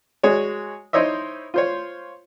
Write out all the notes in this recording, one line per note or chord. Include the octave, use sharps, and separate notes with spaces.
G#3 F#4 G#4 C#5
D#4 E4 C5 C#5 D#5 E5
F4 C5 C#5